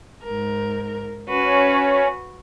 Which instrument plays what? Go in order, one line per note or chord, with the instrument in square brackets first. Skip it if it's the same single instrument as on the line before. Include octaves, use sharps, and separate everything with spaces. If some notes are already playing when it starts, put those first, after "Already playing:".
[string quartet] G#2 A#4
[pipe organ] C#4 [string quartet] F#4 B4